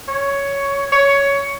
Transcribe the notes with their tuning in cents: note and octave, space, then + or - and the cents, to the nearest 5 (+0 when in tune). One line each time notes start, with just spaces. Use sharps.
C#5 +10
C#5 +10